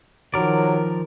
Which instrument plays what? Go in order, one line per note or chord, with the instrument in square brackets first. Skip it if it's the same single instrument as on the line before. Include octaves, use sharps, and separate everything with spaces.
[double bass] D#3 [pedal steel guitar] F3 A#4 D5 [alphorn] F#3